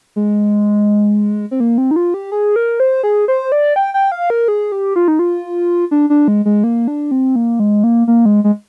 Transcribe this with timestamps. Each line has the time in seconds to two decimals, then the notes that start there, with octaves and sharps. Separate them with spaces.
0.16 G#3
1.51 C4
1.60 A#3
1.78 C4
1.91 D#4
1.96 F4
2.14 G4
2.32 G#4
2.56 A#4
2.80 C5
3.03 G#4
3.28 C5
3.52 D5
3.76 G5
3.94 G5
4.12 F5
4.30 A#4
4.48 G#4
4.72 G4
4.96 F4
5.08 D#4
5.19 F4
5.91 D4
6.10 D4
6.28 G#3
6.45 G#3
6.64 A#3
6.88 D4
7.11 C4
7.36 A#3
7.60 G#3
7.84 A#3
8.08 A#3
8.26 G#3
8.44 G#3